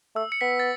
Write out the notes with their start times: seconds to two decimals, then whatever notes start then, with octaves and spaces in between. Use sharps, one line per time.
0.15 A3 E6
0.32 C#7
0.41 B3 B6
0.59 A6